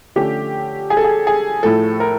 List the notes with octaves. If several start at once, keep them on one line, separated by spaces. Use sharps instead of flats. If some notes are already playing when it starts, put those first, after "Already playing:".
D3 F3 A3 C#4 G4
G#4
A4
G#4
G#4
A2 F3 A3 A4
A#4